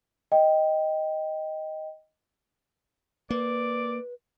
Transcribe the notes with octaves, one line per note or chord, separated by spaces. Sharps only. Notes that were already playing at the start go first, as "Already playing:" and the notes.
D#5 G5
A#3 B4 D5